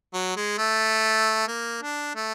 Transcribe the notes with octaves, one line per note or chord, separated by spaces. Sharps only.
F#3
G#3
A3
A#3
D4
A3